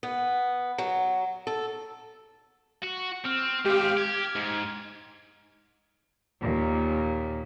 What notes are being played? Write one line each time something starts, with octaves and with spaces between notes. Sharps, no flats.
B3
F#3
A4
F#4
C4 F6
G#2 C4 G4 F5
G4 G#6
G#2
D#2 A#2